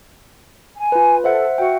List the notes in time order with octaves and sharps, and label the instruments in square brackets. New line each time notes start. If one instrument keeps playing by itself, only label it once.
[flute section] G#5
[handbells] F4 B4
[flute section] A4 [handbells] C5 E5 F#5
[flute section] F#4 F#5 [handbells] E5 G5